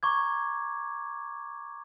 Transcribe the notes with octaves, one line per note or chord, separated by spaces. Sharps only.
A#5 C#6 D6 G#6